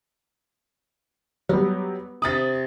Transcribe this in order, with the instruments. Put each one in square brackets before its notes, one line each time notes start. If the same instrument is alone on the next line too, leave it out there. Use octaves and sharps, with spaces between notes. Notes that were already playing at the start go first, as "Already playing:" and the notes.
[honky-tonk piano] F#3 G3 [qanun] B3
[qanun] C3 B5 D6 [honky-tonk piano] D#6 A6